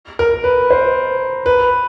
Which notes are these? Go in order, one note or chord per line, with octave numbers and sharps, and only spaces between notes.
A#4
B4
C5
B4